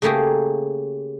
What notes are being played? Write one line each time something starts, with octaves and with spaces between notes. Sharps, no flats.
C#3 A3 A#3 G4 G#4